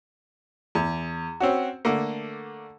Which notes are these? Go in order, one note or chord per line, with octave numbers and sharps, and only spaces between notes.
E2
C4 C#4 F#4
D3 A3 A#3